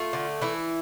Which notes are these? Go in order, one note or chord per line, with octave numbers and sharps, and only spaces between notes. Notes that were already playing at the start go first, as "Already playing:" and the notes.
Already playing: A3 F4
D3
E3 E4